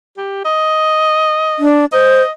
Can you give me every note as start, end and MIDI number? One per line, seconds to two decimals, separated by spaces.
0.17 0.43 67
0.45 1.65 75
1.59 1.85 62
1.92 2.22 72
1.92 2.31 75